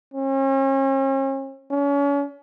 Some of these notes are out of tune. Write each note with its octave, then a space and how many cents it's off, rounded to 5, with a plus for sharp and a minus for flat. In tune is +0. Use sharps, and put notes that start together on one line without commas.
C#4 -40
C#4 +35